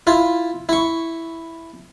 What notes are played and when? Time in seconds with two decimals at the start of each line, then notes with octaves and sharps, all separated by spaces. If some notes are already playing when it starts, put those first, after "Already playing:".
0.07 E4 F4
0.69 E4 C#6